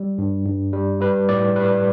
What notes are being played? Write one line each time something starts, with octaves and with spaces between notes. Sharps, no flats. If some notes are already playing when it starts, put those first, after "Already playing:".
Already playing: G3
G2
G2
G3
G3 B4
A2 D5
G3 B4